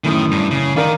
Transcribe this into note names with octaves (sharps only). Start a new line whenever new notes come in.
F#2 A2 D#3 E3
G2
C#3
D#3 A#4 D5 F5